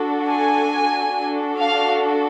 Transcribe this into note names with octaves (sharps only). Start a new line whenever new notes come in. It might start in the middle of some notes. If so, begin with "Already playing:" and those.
Already playing: D4 F#4 A4
G#5
D4 F#4 A4
F5